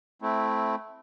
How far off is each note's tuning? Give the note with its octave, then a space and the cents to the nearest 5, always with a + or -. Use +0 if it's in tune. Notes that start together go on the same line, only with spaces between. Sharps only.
A3 -10 C4 +0 E4 +0